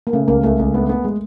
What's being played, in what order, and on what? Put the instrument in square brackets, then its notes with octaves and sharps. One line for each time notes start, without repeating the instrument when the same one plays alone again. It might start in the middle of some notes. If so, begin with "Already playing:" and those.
[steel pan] A#3
[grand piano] C#3 [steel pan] A3
[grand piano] C#2 [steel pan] A#3
[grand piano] C#2 [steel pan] A3
[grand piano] C#2
[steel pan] A3 [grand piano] B3
[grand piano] B3
G#3